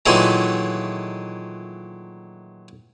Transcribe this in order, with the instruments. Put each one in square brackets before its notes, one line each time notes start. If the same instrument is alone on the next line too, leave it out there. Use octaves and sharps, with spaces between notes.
[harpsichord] A#2 D#3 E3 F#3 G#3 A3